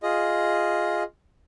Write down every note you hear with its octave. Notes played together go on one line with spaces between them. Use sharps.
F4 G#4 D#5